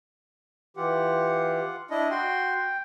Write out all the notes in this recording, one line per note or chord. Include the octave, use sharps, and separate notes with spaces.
E3 F4 G4 F#5
D4 E4 D#5
F#4 G5 C6